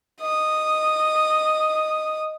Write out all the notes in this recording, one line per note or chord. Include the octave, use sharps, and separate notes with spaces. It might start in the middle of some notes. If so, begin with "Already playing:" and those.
D#5 D#6